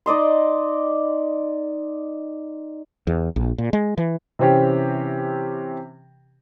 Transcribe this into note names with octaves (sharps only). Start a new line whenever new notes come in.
D#4 D5 D#5 C6
E2
A#1
A#2
G#3
E3
C3 E3 C4 C#4 G4